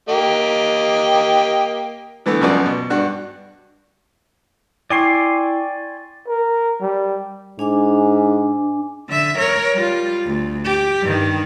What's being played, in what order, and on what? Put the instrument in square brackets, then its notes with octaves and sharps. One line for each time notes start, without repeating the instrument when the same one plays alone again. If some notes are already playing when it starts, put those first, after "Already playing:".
[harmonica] A#3 G4 D#5
[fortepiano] D3 E3 A3 B3
C#2 F#2 F3 B3 F#4 D5
B2
G2 D4 F#4 F#6
[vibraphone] E4 G5 C#6 [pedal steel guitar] D5 G#5 C6
[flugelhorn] A#4
G3
[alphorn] G#2 [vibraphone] D4 G#5 D6
[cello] D3 E5
A#4 C#5
G3 F4
D2
G4
G2 D#3